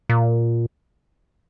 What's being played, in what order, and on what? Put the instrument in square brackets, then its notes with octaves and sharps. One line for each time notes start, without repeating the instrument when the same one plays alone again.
[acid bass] A#2